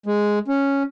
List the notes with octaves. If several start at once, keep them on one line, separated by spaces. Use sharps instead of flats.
G#3
C#4